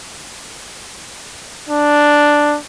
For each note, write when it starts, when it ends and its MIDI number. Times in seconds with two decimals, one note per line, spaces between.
1.69 2.56 62